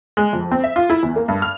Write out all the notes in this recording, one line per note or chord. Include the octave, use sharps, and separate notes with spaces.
G#3
F2
C4
E5
F4
E4
E2
A#3
G2
F6